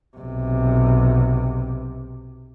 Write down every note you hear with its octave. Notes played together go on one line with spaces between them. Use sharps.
B1 C3